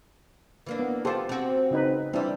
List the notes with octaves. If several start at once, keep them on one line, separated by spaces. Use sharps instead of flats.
E3 A#3 D4
B3
B3 F4 G4 A4 C5
C4 F#4
C#3 D#4 B4
E3 G3 C4 D4 E4